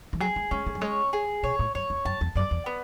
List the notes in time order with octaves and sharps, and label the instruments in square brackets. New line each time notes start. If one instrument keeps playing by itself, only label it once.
[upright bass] E3
[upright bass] F#3 [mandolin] G#4
[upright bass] G#3
[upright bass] G#3 [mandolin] C#4
[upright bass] A3
F#3
[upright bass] G#3 [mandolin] C#5
[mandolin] G#4
[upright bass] B2 [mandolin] C#5
[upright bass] A2
[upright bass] F#2 [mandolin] C#5
[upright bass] E2
[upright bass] F#2 [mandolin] A5
[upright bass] E2
[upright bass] F#2 [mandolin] D5
[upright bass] E2
[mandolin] B3